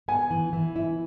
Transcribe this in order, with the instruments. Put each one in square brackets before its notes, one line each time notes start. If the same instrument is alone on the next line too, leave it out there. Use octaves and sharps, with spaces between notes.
[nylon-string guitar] B3 [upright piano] G#5
[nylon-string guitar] E3
E3
E4